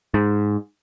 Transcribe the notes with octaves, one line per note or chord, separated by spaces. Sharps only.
G#2